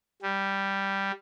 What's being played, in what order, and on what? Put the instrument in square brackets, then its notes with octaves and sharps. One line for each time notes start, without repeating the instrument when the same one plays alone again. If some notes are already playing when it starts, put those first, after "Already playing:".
[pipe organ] G3